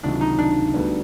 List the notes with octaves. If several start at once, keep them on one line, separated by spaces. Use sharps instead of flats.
C#2 C3 D#3 F#3 D4
D#4
D4
D2 D3 G3 B3